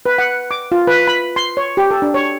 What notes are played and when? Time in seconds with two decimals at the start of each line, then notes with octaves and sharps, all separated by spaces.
0.06 B4
0.18 F#5
0.51 D6
0.72 F4
0.87 B4
1.08 B5
1.36 C6
1.57 C#5
1.77 G4
1.91 A4
2.02 D4
2.14 C#5